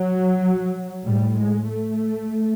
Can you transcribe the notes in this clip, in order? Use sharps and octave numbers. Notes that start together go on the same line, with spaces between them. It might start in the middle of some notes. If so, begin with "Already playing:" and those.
Already playing: F#3
A2 G3
G#3
A3